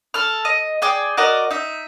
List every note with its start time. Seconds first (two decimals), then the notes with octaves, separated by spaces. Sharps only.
0.14 A4 F6
0.45 D#5
0.82 G#4 D5 G5
1.17 F#4 A#4 D5 D#5
1.51 D#4 E5